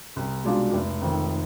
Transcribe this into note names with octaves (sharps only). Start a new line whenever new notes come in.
C2
B2 G#3 D4 F4
F1
F2 D#3